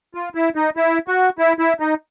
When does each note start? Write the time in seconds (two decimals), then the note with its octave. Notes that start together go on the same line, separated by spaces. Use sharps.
0.15 F4
0.35 E4
0.56 D#4
0.77 E4
1.08 F#4
1.39 E4
1.59 E4
1.80 D#4